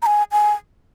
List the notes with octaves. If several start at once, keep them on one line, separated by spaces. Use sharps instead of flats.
A#5
G#5
G#5